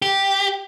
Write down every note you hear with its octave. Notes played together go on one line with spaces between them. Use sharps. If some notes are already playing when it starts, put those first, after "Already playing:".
G4